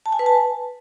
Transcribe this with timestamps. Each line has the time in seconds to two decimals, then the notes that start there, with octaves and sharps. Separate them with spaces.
0.06 A5
0.12 G#5
0.19 B4
0.26 A5